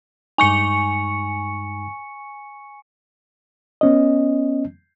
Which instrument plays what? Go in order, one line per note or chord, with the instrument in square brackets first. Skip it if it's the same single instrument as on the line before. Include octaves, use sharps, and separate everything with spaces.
[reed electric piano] G2 G#3 D#4 [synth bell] G#5 C#6 C#7
[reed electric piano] B3 C#4 D#5